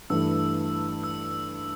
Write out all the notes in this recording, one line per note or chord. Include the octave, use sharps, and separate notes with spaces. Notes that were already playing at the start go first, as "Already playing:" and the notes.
G2 E3 A3 E6
E6